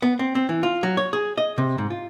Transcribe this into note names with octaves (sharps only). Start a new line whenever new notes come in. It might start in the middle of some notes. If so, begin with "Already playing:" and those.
B3
C4
C4
E3
F4
F#3
C#5
G#4
D#5
C3
G#2
F4